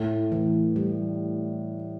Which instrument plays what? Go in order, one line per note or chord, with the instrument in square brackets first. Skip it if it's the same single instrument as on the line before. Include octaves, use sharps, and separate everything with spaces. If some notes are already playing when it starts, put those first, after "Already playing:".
Already playing: [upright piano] A2 [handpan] A3
[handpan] E3
G3